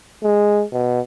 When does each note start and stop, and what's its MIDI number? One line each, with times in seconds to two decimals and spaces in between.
0.23 0.63 56
0.73 1.00 47